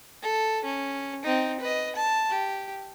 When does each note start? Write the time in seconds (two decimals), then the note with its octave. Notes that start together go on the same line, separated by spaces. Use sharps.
0.22 A4
0.65 C#4
1.23 C4 D#4
1.60 B4 D#5
1.96 A5
2.29 G4